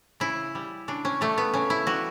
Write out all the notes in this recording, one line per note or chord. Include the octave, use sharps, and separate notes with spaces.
C#3 E4
G3
C#3 D4
C#4
G3 A3
B3
C#3 C#4
E4
G3 F#4